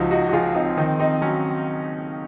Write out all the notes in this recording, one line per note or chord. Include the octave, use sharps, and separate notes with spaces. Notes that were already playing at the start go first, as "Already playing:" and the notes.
Already playing: C#2 F3 D#4 F#4
D#4 F#4
F#4
F3 F4 G#4
C4 D#4
D#3 C4 D#4
C4 D#4
F#3 C#4